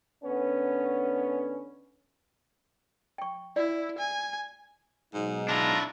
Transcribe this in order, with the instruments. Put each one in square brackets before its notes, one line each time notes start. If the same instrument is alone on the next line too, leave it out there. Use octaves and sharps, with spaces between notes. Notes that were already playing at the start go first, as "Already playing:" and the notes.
[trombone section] D3 B3 C#4
[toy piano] G5 C#6
[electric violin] E4 [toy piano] D5
[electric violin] G#5
[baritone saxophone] G#2 [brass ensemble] B2 F#3 D#4
[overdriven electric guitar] D4 E4 [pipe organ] F4 A#5